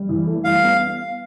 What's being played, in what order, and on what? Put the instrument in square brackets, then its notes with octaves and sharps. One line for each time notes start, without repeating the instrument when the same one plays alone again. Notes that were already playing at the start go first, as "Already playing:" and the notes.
Already playing: [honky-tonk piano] G3
E3
A3
[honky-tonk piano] G3 [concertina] F5
[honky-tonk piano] B3